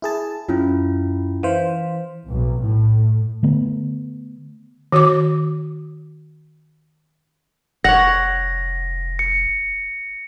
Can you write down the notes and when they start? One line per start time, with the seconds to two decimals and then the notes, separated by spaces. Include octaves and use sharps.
0.02 E4 G#4 A5
0.49 F#2 C#4 E4 F4
1.43 E3 C5 F5
2.30 B1
2.62 A2
3.43 D3 A3 B3
4.92 D#3 F#4 C#5 D6
7.84 F1 C#5 F#5 A#6
9.19 C#7